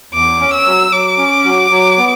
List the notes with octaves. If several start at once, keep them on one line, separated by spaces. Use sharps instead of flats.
E2 D6
C#4
E6
F#3
F#3 D6
C#4
F#3
F#3
B3